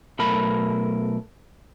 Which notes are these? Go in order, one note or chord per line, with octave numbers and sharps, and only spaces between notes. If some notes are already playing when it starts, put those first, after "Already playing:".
B1 A3 A#4 B5